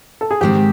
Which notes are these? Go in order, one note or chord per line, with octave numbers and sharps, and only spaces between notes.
A4
G#4
G#2 D#3 G#3 C4 G4